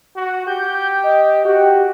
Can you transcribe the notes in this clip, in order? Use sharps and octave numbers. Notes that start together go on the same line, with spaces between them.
F#4
G4 G6
D#5
F#4 G4